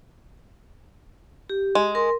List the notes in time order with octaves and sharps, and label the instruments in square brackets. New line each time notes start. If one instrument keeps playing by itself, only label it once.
[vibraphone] G4
[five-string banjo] G#3
[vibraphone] A#4 C6